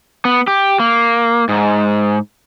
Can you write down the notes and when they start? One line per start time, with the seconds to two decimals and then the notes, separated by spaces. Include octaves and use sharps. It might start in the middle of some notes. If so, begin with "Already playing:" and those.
0.25 B3
0.47 G4
0.80 A#3
1.49 G#2